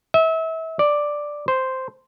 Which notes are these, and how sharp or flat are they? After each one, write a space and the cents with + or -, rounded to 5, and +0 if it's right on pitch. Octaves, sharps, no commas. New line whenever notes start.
E5 -30
D5 +5
C5 -5